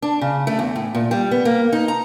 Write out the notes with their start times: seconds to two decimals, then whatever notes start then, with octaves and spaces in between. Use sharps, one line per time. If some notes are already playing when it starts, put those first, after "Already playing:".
0.02 D4
0.21 C#3
0.47 A3
0.59 E2
0.76 A2
0.95 A#2
1.11 G3
1.31 B3
1.45 A#3
1.73 D#4
1.88 A#5